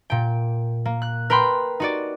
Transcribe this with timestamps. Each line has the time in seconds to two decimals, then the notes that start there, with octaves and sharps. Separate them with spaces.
0.10 A#2 G5
0.85 A#3
1.02 F#6
1.30 A#4 B4 G5 B5 C6
1.80 D#4 F#4 D5